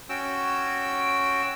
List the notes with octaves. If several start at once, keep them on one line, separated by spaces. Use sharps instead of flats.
C#4 F#4 G5 E6